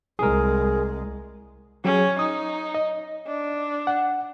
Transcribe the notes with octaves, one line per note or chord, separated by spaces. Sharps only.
C2 G#3 G#4 A#4
F#3 C#4 G#4
D#4 D#6
D#5
D4
F#5